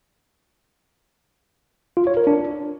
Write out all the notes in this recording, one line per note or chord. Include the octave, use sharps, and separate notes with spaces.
F4
C#5
A#4
D4